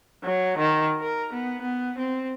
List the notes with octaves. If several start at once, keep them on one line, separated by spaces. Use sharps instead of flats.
F#3
D#3
A#4
B3
B3
C4